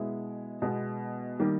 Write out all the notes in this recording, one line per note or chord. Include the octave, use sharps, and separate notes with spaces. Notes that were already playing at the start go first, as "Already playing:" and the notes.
Already playing: B2 G#3 B3 E4
B2 G#3 B3
D#3 G3 A#3